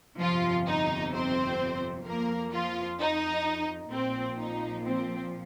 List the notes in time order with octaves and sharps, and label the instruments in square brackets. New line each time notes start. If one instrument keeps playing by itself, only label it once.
[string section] G1 F2 C3 F3 F4
D#4
C4 C5
F2 F3 A#3 A#4
F3 F4
D#4
A#1 A#2 F3 C4
D#4
C4